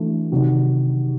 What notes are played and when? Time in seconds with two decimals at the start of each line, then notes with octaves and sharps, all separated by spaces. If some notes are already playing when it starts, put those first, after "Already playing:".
Already playing: E3 A3 D4 F#4
0.32 C3 D#3 F#3